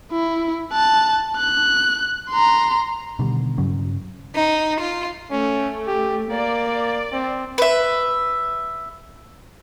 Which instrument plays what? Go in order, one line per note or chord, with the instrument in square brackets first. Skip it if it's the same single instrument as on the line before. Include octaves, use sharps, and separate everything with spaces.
[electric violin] E4
A5 F#6
F#6
A#5 C6
[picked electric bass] B2 D3 D#3 G3
G2 C#3 F#3 C#4
[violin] D#4
F4
[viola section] A3 [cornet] C#4
[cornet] G4
[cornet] A#3 [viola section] D5
[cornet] C4
[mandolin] B4 E5